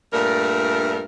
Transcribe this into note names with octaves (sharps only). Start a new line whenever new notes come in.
G2 A#2 A3 A#4